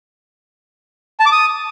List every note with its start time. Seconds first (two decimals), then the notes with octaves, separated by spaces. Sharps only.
1.20 A5
1.26 D6
1.32 D#6